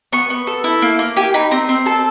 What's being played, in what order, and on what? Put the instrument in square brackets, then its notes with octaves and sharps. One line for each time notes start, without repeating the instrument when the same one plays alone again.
[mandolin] B3 C#6
B3
A4
E4
A#3
A#3
G4 G#5
D#4 B5
C4 A#5
C4
A4 A5